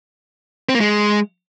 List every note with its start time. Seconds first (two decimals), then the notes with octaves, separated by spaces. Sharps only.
0.69 C4
0.75 A#3
0.80 G#3